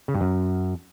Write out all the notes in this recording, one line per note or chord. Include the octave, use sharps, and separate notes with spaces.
C#3
G2
F#2